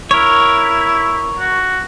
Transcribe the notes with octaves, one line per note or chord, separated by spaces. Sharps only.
E4 A#4 C#5
F#4